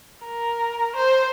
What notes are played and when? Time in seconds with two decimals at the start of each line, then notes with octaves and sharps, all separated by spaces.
0.25 A#4
0.96 C5